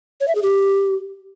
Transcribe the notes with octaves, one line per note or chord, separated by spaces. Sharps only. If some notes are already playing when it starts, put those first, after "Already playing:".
C#5
E5
G#4
G4